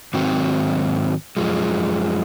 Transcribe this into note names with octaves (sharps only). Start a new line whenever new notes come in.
G#2 D#3 F#3 C4 F#4
F#2 F3 G#3